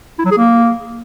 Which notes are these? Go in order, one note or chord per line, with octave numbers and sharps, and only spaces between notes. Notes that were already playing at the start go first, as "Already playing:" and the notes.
E4
F#3
G#4
A#3